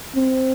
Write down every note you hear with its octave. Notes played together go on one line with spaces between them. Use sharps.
C4